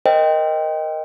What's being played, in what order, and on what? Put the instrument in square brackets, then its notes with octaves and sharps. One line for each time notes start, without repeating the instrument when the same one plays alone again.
[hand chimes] A#4 C5 D#5 G5